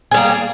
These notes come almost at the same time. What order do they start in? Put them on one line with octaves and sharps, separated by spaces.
G#4 G3 A#3